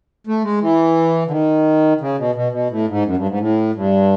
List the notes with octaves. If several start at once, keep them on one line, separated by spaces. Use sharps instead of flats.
A3
G#3
E3
D3
D#3
C#3
B2
B2
B2
A2
G#2
F#2
G2
G#2
A2
G2